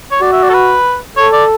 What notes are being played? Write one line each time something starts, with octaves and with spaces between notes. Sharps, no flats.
C#5
F#4 D5
E5
D5
A4
B4
A4 C#5
D5